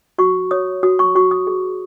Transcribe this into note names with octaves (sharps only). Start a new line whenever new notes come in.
F#4 C#6
C#5 D#6
F#4 D#6
C#6
F#4 C#6
D#6
G#4